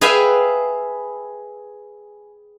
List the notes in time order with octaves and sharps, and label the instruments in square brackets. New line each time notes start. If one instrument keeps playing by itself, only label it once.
[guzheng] G#4 B4 E5 F5 G5 G#5